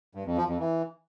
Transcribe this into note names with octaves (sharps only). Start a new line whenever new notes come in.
G2
F2
F3
F2
E3